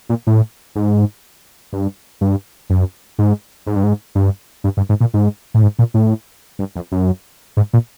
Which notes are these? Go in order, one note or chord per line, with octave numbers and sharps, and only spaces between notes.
A#2
A2
G#2
G2
G2
F#2
G#2
G#2
G2
G#2
G2
G2
G2
G#2
A#2
G#2
A2
G#2
A#2
A2
G2
F2
F#2
G#2
A#2